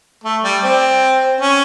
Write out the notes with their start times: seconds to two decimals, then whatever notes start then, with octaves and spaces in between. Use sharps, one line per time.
0.24 A3
0.44 G3
0.64 C4
1.41 C#4